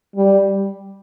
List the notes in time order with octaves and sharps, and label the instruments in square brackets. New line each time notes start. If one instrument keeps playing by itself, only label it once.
[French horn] G3